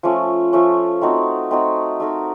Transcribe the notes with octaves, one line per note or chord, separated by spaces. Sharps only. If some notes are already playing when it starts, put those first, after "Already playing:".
F3 A3 C#4
F3 A3 C#4
A3 C4 D#4 F#4
A3 C4 D#4 F#4
A3 D#4 A#4